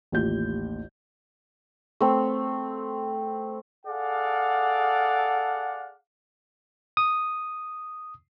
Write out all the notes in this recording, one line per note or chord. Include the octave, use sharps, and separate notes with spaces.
A1 D#2 F4 G4 G6
A3 C4
G#4 A4 D5 F5 F#5
D#6